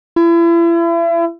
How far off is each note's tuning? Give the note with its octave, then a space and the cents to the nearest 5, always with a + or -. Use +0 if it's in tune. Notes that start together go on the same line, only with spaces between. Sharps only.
E4 +35